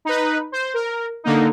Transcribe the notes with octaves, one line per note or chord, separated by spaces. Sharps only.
D#4 B4
C5
A#4
D3 A#3 D#4